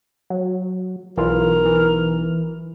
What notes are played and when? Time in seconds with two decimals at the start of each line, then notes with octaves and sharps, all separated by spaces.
0.30 F#3
1.17 B1 E3 F4 A#4
1.65 E3